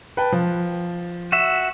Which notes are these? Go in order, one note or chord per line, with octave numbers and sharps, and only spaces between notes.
B4 G5 A5
F3
F#4 E5